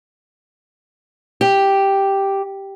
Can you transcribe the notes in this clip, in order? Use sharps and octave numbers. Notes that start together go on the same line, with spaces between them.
G4